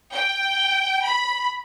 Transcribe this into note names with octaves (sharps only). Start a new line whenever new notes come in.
G5
B5